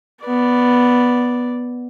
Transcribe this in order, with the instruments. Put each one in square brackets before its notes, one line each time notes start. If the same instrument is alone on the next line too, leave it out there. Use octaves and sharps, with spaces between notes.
[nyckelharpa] B3 D5